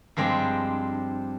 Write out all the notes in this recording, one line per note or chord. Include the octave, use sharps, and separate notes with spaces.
G2 F3 G#3 C4 D4